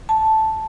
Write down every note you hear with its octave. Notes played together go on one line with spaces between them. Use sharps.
A5